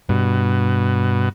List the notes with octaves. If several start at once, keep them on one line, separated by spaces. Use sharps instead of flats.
G2 B2